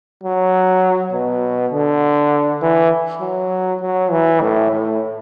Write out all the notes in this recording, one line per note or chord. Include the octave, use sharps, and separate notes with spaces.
F#3
B2
D3
E3
F#3
F#3
E3
A2
A2